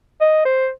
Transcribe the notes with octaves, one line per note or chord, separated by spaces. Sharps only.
D#5
C5